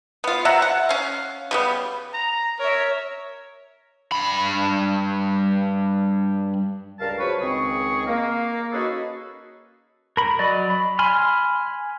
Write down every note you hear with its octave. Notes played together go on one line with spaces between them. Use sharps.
B3 F4
C3 E5 F#5 A#5
F#5
C#4 F5
C#3 G3 B3
A#5
A#4 C#5 E5
G2 B5
C#2 G2 A#4 F5 A5
F3 F#3 G#4 B4 C#6
C#2 D#3 C4 G#4 C#6
A#3
C#4 D#4 F#4 G#4 A4 B4
A#4 B5
F#3 D5 D#5
B5
G#5 B5 C6 F6